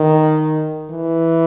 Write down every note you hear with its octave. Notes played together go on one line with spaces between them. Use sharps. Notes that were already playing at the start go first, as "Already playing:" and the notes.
Already playing: D#3
E3